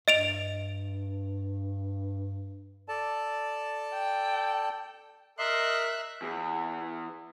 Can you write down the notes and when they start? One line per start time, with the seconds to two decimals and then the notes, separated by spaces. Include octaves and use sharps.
0.08 G2 D#5 D7 F7
2.88 A4 D5 A5
3.94 G5
5.39 A#4 D#5 E5 C6 F#6
6.22 E2